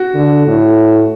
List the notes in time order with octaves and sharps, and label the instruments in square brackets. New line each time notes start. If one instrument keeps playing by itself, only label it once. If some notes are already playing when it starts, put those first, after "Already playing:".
Already playing: [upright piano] F#4
[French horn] D3
A2